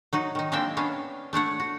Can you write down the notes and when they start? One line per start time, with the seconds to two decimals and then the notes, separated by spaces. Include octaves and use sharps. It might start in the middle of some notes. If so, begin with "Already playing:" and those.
0.13 F#3 D#4 F#4
0.35 D#3 D#4
0.52 G#3 A#3 C4 D4 E5 G5
0.77 B3 C#4 D4 F5
1.33 A3 D4 C#5 F#5
1.60 F#4